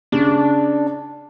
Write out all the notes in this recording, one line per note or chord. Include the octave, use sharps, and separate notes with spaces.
C#3 D4